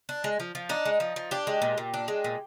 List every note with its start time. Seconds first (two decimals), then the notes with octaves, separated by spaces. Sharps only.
0.09 D4
0.24 G#3
0.40 F3
0.55 F3
0.69 D4 D#4
0.85 G#3
1.00 F3
1.16 F3
1.31 D4 G4
1.47 G#3
1.62 A#2
1.78 A#2
1.94 D4
2.08 G#3
2.24 A#2